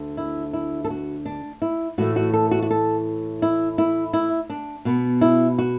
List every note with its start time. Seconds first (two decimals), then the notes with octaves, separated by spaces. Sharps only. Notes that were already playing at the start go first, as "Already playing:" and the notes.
Already playing: D2 D3
0.17 E4
0.53 E4
0.85 A4
0.90 F#4
1.26 D4
1.62 E4
1.98 A2 E3 A3 F#4
2.16 F#4
2.34 A4
2.51 F#4
2.62 F#4
2.71 A4
3.42 E4
3.78 E4
4.13 E4
4.50 D4
4.85 B2 B3
5.21 E4
5.58 F#4